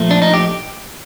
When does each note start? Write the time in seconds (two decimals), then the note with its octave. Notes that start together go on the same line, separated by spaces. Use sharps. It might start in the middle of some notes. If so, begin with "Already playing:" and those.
Already playing: A#2 F3 A3
0.11 D4
0.22 D#4
0.34 G4